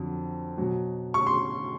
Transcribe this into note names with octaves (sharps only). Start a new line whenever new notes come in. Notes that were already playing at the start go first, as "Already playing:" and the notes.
Already playing: F2 D3 F#3
B2 F#3
C#6
C6